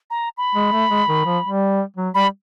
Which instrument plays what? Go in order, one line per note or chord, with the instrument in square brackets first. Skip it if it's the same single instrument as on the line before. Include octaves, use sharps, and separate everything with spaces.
[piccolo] A#5
B5
[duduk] G#3
A3
G#3
D#3
F3
G3
F#3
[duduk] G3 [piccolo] B5